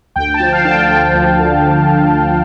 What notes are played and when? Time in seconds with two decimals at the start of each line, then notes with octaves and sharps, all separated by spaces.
0.16 D2 G5
0.34 A5
0.40 F3
0.46 G5
0.53 F5
0.64 D3 A5
0.71 G5
0.89 F3 G5
1.14 D2
1.39 D3